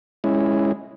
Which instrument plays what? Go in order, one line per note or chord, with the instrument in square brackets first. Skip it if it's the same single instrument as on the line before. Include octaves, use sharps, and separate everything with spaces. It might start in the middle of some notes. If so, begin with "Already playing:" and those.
[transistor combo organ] G#3 C#4 E4